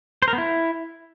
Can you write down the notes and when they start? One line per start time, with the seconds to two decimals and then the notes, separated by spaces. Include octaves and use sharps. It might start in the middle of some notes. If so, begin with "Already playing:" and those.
0.22 C5
0.28 A#4
0.33 B3
0.38 E4